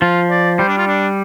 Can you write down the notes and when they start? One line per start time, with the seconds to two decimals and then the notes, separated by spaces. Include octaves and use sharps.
0.01 F3 F4
0.31 D5
0.59 G3 C5
0.68 D4
0.78 F4
0.87 D4